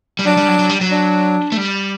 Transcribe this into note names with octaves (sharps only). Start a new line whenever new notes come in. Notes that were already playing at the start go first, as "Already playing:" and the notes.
G3
F#3 D4
G3
F#3
F#3
G3
F#3
D4
A3
G3